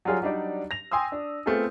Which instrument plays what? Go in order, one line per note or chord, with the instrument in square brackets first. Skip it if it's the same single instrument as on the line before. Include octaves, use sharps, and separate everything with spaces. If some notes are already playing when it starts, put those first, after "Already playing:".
[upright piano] F#3 G3 F4 G#4 C#5
F#3 G3 D4 D#4 D5
A#6 F7
G5 G#5 C6 D#6 E6
D4
A3 B3 C4 F4 G#4 A4